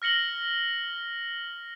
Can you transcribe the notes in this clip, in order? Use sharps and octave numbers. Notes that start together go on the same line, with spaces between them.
F6 A#6 C#7 F#7 G7